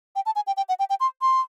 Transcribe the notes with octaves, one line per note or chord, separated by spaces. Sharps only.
G5
A5
G#5
G5
G5
F#5
G5
G5
C6
C6